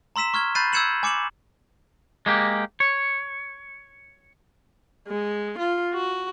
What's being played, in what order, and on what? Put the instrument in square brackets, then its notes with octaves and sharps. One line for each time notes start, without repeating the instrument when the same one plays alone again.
[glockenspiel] A#5 C6 E6 B6 E7
C#6 F6 G#6 G7
B5 F#6 G6 A6 C7 D#7
E6 G6 G#6 C#7 E7 F#7
G#5 D6 C#7 E7 F#7
[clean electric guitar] G#3 A#3 G4
C#5
[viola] G#3
F4
F#4